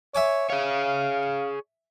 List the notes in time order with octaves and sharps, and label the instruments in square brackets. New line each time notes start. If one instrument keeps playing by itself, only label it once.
[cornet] C#5 [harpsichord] E5 G#5 D6
[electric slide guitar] G#4 C#5 [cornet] F5